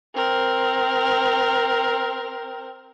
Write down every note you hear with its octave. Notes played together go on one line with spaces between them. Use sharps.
C4 A#4